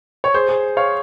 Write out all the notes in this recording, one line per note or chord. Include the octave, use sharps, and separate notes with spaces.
C#5
G#4 C5
G#4
C#5 F5